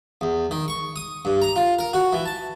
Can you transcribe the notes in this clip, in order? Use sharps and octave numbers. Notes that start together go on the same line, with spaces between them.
E2
D#3
C#6
D#6
G2
A#5
F4
A#4
F#4
E3
A5